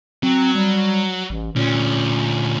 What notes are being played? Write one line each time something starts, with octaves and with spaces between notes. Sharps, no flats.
F#3 C4
G3
A1
D2 A#2 C#4